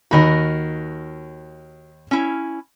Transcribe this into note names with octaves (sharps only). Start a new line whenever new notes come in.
D#2 F#4 A#4 D#5 B5
C#4 E4